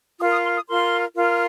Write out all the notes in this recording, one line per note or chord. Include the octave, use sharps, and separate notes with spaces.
F4 A#4 D#6
D#6
C6
D#6
F4 A#4 C6
F4 A#4